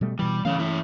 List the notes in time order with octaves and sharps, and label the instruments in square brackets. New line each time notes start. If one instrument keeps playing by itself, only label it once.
[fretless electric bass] B2 G3 A3
[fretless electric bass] B2 E3 [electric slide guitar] G3
[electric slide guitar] A2 C#3 F5 [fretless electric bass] E3 A3 C#4
[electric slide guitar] A#3 E4 E5